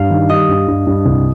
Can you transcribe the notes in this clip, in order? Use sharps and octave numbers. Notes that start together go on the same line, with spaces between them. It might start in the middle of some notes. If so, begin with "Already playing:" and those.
Already playing: G2 F5
D#3
G3 D#5
G2
G2
G2
C2